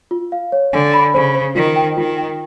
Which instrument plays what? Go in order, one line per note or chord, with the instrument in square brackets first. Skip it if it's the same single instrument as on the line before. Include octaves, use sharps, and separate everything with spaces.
[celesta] F4
F5
C#5
[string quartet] D3 [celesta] G#5
[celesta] B5
[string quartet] C#3 [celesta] C5
[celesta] C5
[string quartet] D#3 [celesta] F4
[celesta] G5
[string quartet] D#3 [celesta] F4
[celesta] G5